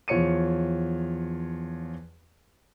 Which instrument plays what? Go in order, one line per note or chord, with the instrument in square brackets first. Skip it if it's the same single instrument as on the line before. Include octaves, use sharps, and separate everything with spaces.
[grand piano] E2 F3 C#5 C#7 D#7